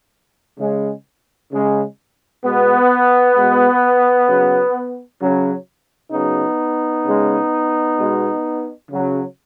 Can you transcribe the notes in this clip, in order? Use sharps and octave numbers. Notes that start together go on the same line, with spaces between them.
C#3 G#3
C#3 G#3
B2 G#3 B3
B2 G#3
C#3 F#3
C#3 F#3
C#3 F#3 B3 D#4
C#3 G#3
B2 G#3
C#3 F#3